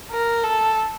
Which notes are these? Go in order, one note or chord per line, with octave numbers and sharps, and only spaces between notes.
A#4
A4